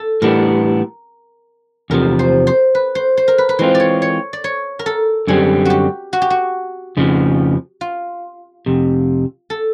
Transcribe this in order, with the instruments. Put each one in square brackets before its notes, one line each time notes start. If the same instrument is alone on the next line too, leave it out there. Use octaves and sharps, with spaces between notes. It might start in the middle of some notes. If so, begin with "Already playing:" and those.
Already playing: [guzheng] A4
[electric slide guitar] A2 E3 G3 B3 D4 [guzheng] A#4
[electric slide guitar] E2 C3 F3 [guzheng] A#4
[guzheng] C5
C5
B4
C5
C5
A#4
B4
B4
[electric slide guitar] E3 G#3 C4 F4 [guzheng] C5
[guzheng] D5
C#5
C#5
D5
C#5
A#4
A4
[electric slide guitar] F#2 D3 G3 C4 [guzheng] G#4
[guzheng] F#4 G4
F#4
G4
F#4
[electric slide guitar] F2 C#3 F3
[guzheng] F4
[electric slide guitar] F2 C3
[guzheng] A4